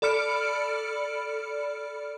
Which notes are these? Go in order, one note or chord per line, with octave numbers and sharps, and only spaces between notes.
A4 D5 B5 F6 C#7 D7